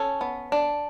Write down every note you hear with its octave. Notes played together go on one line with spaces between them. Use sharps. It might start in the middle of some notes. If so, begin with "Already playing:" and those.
Already playing: C#4 A4 C#5
B3
D4